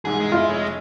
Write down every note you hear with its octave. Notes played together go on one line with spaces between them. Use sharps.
E1 C2 G#2 G#4
G#3
E4 F4
F1 C#5